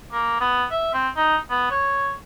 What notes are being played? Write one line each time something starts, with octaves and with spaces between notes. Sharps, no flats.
A#3
B3
E5
C4
D#4
B3
C#5